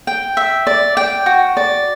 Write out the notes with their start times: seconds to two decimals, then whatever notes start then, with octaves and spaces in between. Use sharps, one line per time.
0.07 G5
0.37 E5
0.67 D5
0.97 G5
1.26 F#4
1.57 D5